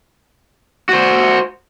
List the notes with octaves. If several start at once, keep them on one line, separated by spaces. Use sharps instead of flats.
F#4 C5